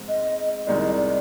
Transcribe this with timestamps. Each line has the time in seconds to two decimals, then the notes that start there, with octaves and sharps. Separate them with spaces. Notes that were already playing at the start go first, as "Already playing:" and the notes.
Already playing: G#2 F3 G#3 C4
0.08 D#5
0.67 C2 C3 D#3 G#3 D5
0.80 D#5
0.92 D5